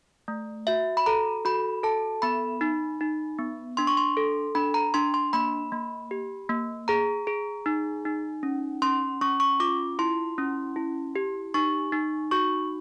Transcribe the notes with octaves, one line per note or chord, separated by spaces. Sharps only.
A3
F#4 E5
B5
A4 A#5
F#4 B5
A4 A5
B3 B5
D#4
D#4
B3
D4 C6
C#6
C6
A4
D4 B5
A#5
D4 C6
C6
A#3 B5
A#3
G4
A#3
G#4 A#5
G#4
D#4
D#4
C#4
C#4 C6
C#4 C#6
C#6
F4 D6
E4 C6
C#4
E4
G4
D#4 C#6
D#4
F#4 C#6